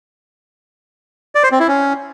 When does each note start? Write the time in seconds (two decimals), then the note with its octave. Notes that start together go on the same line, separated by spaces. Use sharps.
1.35 D5
1.43 C5
1.52 C4
1.60 E4
1.68 C#4